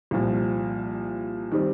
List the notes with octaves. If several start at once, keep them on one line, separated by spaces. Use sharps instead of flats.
C2 A#2 F3
D#3 G3 C4